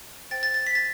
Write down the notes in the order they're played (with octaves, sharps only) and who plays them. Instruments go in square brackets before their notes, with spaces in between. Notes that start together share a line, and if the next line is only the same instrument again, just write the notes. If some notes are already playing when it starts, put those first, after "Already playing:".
[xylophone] C5 G5 A6
A6
A6
B6
A6